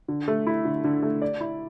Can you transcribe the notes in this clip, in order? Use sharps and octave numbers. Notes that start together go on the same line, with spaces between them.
D3
A3
E4
D3
D3
A3
D5
E4